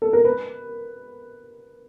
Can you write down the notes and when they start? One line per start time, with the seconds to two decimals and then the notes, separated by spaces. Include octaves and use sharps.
0.02 A4
0.13 A#4
0.25 B4